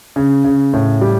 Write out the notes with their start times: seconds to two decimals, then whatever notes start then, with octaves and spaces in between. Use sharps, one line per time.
0.16 C#3
0.44 C#3
0.73 A2
1.01 G3